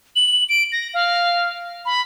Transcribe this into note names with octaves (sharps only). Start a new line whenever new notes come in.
F#7
D7
A#6
F5
B5